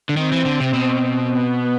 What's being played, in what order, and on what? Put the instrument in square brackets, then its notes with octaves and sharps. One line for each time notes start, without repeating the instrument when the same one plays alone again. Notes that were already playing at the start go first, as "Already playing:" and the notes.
[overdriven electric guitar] D3
[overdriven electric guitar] D#3 [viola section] C4
[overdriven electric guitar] E3
D3
C3
B2
[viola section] B3